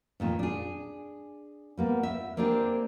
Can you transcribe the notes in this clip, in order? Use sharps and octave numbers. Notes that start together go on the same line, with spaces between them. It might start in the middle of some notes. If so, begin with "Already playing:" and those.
F2 A#2 D#3
D4 G#4
G3 A#3 B3
E5
A#3 C4 D4 G4 G#4